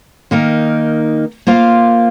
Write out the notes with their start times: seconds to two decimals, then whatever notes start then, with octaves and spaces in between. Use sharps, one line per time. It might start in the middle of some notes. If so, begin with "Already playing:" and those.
0.31 D#3 A#3 D#4 A#4
1.47 A#3 F4 C5 F5